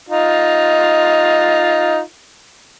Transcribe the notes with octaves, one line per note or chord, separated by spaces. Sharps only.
D#4 F4